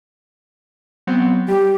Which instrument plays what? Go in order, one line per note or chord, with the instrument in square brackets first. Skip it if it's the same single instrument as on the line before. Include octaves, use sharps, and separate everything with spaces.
[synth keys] F#3 B3 C4
[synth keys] G3 [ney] G4